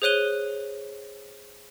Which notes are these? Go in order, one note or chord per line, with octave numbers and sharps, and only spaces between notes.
G#4 C5 C#5 F#6 D#7 G7